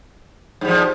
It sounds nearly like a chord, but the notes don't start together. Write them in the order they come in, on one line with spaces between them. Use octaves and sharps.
G#2 G3 F3